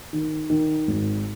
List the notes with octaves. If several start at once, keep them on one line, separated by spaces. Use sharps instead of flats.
D#3
D#3
G#1